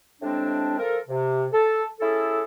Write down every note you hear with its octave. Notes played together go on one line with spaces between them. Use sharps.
A2 C3 G#3 C4 D4
F3 A4 A#4
C3
A4
C#4 E4 G#4 A4